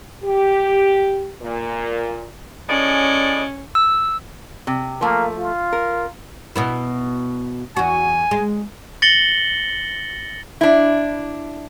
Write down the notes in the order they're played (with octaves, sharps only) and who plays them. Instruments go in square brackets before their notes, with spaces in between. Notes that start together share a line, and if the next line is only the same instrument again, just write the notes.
[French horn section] G4
A#2
[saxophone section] A2 G#3 D5 [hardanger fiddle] C#4
[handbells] E6
[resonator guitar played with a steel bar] C3
[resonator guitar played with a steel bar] F3 A3 [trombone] A#3
[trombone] F4
[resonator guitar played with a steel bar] A#4
[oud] B2 B3 E4
[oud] E2 F#4 [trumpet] G#5
[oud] G#3
[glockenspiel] A6 A#6 C#7 F#7 G7
[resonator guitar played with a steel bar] D4 E4